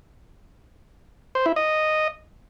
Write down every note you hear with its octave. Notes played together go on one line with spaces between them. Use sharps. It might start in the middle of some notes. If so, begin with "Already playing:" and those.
C5
E4
D#5